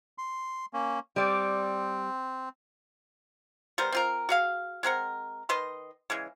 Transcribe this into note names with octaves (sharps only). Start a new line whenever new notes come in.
C6
A#3 C#4
G3 C4 D5
G3 B3 A#4 C5
C4 F4 A#4
F#4 G#4 F5
G#3 C4 A#4 F#5
D#3 B4 D#5 C6
C#3 E3 G#3